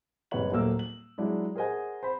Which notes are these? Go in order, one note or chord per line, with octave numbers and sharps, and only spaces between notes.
F#1 G3 G4 B4 C#5 F#7
D#1 F#3 A3 A#3 E6
F#7
F#3 G#3 D4 E4
G#4 A#4 C5 D#5 F#5 G#5
C5 B5